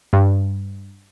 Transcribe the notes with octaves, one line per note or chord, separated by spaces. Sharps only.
G2